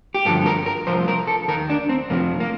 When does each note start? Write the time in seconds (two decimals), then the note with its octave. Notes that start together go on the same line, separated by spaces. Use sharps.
0.15 G4
0.25 G2 D3 F3 A4
0.46 A#4
0.66 A#4
0.87 A#2 F3 C5
0.92 C2
1.08 A#4
1.27 A4
1.48 D#2 D#3 A#4
1.70 D4
1.89 C4
2.10 F2 C3 F3 A#3
2.40 A#3